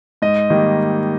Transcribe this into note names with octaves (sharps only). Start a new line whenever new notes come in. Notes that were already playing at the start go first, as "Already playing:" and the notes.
G#2 D#5
D#3 G3 A#3